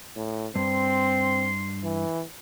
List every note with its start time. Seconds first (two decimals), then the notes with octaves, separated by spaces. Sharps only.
0.16 A2
0.55 G2 C4 C6
1.83 E3